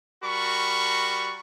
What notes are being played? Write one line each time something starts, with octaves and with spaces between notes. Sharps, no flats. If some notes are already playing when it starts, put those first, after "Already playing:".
G3 F#4 A#4 B5 C#6